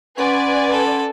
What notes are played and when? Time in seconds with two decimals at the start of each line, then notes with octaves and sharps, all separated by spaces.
0.18 C#4 B4 D5 F#5 G#5 C6
0.72 A4